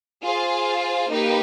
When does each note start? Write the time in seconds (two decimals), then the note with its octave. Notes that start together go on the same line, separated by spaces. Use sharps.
0.22 F4 G#4 C5 F5
1.10 A#3 D#4 G4 B4